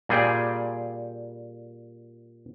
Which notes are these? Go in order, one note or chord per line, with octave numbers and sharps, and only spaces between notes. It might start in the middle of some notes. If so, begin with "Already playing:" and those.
A#2 G3 G#4 G5